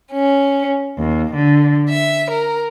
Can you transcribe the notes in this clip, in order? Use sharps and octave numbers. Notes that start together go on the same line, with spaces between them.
C#4
D#2
D3
E5
A#4